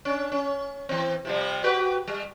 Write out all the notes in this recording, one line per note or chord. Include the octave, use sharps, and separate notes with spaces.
C#4 D4
C#4
E3 C4
C3 F3 G3
F#4 G4 B4
G3